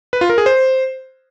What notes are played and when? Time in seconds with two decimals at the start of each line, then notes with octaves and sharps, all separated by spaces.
0.13 B4
0.21 F4
0.30 A#4
0.38 G#4
0.46 C5